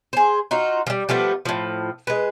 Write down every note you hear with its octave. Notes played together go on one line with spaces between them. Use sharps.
G#4 C5
D#4 F4 F#4
F3 G3
F3 G3 A3 B3
A2 F3
G#3 B4